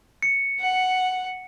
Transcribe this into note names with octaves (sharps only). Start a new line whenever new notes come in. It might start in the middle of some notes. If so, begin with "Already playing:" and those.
C#7
F#5